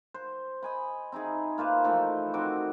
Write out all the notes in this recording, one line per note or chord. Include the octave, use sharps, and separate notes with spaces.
C5
D#5 G#5 B5
C4 D#4 E4 G#4
A#3 F4 B4 C5
E3 F3 A3 D#4
D#3 C4 F#4 D6